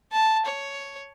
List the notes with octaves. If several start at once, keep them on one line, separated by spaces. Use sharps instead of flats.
A5
C#5